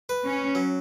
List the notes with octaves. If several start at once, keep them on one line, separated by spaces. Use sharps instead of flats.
B4
C#4
F#3